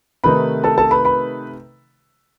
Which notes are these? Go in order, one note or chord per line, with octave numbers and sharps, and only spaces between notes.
C3 D#3 A3 D#4 B4 B5
A4 A5
A4 A5
B4 B5
B4 B5